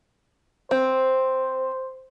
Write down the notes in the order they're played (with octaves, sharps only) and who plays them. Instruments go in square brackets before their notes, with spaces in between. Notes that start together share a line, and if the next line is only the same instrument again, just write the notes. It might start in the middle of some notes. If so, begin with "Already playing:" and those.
[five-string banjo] C4 [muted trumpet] C5